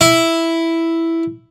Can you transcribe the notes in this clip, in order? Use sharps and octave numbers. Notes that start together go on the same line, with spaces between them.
E4